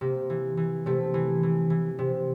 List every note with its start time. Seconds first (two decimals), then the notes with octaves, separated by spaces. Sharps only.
0.01 C3 A#3
0.30 E3
0.57 E3
0.86 C3 A3
1.14 E3
1.43 E3
1.70 E3
1.99 C3